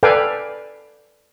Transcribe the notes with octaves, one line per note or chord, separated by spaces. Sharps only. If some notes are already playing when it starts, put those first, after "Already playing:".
A4 B4 D5 F5 G5 G#5